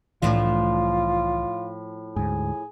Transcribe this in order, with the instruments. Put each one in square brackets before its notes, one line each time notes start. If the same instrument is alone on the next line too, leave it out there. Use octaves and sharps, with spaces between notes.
[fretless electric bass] C2 E3 [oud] A2 F3 D4 [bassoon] F4
[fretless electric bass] D2 G#2 [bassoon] G#4